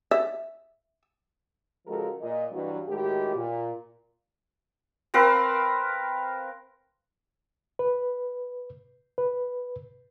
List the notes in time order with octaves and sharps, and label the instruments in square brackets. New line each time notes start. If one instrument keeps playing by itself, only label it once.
[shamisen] E5
[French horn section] C#3 F3 G#3 F#4 A4 A#4
A#2 D#5
G2 E3 F#3
A2 D#3 G#3 F#4 G4
A#2
[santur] C4 A#4 B4 F5
[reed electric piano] B4
B4